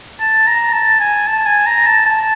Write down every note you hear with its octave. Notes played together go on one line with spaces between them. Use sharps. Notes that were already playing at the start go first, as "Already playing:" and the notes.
A5
A#5
A5
G#5
A5
G#5
A#5
A5
A5